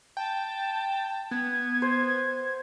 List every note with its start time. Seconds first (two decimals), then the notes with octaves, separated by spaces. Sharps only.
0.17 G5 A5
1.31 B3 G#6
1.82 C5